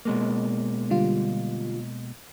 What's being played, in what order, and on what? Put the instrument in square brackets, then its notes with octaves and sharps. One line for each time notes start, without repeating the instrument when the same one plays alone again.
[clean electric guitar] B2 G#3 A#3
[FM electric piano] D3 G3 F4